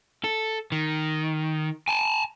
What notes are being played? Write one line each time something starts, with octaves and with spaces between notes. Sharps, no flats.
A4
D#3
G#5 A5